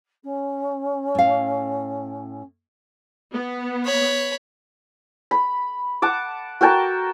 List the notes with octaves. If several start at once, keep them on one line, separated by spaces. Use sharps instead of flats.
C#4
A2 F5
B3
C#5 B5
B5
F#5 A5 D6
F#4 A#4 G5 A5